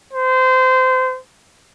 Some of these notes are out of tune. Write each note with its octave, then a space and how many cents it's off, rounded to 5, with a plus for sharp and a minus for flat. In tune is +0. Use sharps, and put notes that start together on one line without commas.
C5 -25